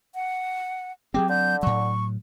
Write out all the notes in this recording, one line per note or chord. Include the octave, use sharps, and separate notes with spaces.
F#5
F#3 G3 C4 G4 G#4
D3 G6
A2 F#3 C#6